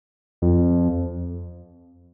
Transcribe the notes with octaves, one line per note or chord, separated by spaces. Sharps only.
F2